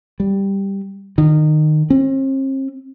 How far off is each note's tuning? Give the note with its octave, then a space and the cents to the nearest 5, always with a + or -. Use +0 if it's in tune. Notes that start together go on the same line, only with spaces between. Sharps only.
G3 +5
D#3 -25
C4 +45